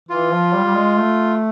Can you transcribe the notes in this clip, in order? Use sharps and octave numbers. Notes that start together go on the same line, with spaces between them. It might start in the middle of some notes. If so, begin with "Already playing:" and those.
E3 F4
F3
G3
G3
G#3
A3